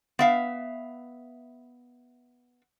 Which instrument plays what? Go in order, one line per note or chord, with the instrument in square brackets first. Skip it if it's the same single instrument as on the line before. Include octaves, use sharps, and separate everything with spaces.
[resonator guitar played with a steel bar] B3 E5 F5